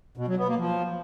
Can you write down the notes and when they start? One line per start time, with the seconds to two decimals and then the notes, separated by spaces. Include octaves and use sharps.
0.17 B2
0.28 F#3
0.38 B3
0.48 A#3
0.58 F3